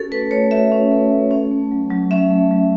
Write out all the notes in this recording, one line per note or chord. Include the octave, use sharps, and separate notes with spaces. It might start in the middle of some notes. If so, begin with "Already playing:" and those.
Already playing: C#4 F#4 A4
A3 B4
A3 C#5
F#4 E5
C#4
A3
A3
C#4
A3
F#3
F#3
C#4 E5
A3
F#3